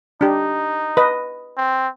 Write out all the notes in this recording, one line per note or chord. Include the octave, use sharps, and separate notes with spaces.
D4 D#4 G4
B4 D#5
C4